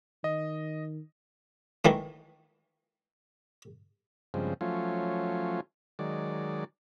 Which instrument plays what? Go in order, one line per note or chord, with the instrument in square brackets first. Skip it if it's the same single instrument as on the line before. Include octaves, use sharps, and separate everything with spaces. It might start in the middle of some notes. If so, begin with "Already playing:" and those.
[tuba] D#3 [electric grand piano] D#5
[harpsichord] D#3 E3 A3
[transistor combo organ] G2 C#3 F3 G#3 C4
F3 F#3 A3 C#4 F4
D#3 F#3 G#3 D5